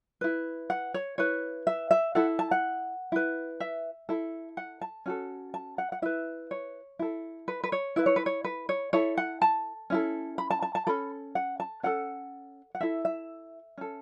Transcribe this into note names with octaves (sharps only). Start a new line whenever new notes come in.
E4 B4
F#5
C#5
E4 B4 C#5
E5
E5
E4 A4 F#5
A5
F#5
E4 B4
E5
E4 A4
F#5
A5
C#4 F#4 A4
A5
F#5
F#5
E4 B4 E5
C#5
E4 A4
B4
B4
C#5
E4 B4 E5
C#5
B4
C#5
B4
C#5
E4 A4 C#5
F#5
A5
C#4 E4 A4
B5
A5
A5
A5
C#4 A4 B5
F#5
A5
C#4 A4 F#5
F#5
E4 A4 E5
E5
C#4 A4